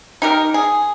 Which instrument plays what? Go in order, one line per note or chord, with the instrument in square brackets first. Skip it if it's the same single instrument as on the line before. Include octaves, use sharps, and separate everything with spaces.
[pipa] D#4 G4 A#4
G#4